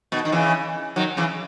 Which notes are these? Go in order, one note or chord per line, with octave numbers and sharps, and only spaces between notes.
B2 D#3
D#3
C#3 E3
D#3 F#3
C#3 E3